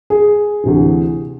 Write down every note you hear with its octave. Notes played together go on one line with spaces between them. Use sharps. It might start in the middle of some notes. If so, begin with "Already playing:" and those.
G#4
D2 C3 E3